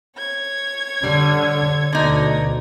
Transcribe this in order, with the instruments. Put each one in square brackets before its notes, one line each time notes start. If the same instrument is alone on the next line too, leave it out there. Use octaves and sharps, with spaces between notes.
[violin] C#5 G#6
[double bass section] D3 [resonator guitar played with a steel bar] G3
[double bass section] D2 B2 [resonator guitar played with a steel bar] D3 D#4